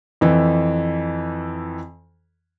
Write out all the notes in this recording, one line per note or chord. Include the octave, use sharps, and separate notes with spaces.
F2 E3